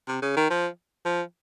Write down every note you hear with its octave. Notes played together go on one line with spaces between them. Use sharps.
C3
C#3
D#3
F3
F3